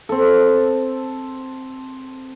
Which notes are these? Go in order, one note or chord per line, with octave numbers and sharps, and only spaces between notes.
C4 A4